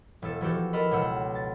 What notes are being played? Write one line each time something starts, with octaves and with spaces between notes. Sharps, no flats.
E1 A4
E3 F3 F#4 G4 A4
A4 A#4 D#5 B5
C#2 B2 G4 F#5 E6
A6